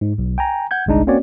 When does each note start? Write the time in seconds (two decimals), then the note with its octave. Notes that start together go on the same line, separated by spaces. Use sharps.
0.01 G#2
0.18 B1
0.38 G5 G#5 A#5
0.71 F#5 G6 G#6
0.86 G1 C2 G#3 D4 D#4
1.07 A#3 C4 C#4 F#4 C#5 D5